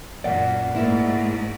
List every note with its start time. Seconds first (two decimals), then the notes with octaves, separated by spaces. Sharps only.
0.24 F#2 A#2 D5 F#5
0.75 G#2 A3 A#3 E4